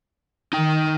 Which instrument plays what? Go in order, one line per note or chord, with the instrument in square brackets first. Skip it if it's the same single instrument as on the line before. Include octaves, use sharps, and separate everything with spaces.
[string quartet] D#3 [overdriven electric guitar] D#4 G5